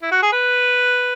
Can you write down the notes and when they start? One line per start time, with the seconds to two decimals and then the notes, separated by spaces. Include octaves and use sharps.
0.03 E4
0.11 F#4
0.22 G#4
0.32 B4